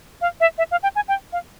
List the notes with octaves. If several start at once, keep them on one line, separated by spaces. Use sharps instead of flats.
F5
E5
E5
F5
G5
G#5
G5
F5